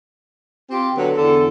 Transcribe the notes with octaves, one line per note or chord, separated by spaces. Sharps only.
C4 F4 G4
D3 F#3 B3 A4
E2 D3 A4